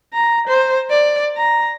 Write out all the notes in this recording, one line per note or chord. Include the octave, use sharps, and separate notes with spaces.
A#5
C5
D5
A#5